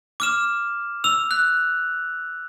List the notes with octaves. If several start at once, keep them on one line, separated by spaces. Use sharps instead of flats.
D6 F6 E7
E6 F7
F#6